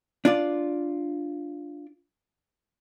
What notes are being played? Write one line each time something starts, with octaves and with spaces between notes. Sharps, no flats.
D4 F4 D5